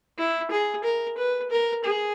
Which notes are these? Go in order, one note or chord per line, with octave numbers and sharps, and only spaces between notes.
E4
G#4
A#4
B4
A#4
G#4